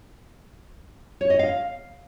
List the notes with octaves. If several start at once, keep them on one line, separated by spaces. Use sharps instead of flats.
C#5
D#5
F5